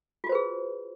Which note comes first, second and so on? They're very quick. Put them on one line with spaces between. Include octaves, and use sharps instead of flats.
F4 F#4 C5 B4 G#4